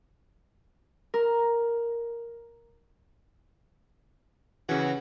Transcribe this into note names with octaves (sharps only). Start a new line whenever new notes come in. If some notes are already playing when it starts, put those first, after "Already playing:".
A#4
C#3 E3 C#4 F#4